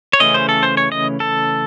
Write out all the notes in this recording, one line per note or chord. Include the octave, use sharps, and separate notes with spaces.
C#5
C#3 E3 A3 C#4 D#5
C5
A4
C5
C#5
D#5
A4